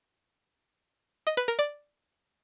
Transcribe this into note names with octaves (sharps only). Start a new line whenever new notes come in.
D#5
B4
A#4
D5